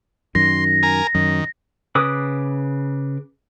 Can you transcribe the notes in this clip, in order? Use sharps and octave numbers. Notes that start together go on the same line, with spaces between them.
F#2 D#3 C6 A#6
A#4 G#5 A#5
F#2 D#3
C#3 B4 D6 D#6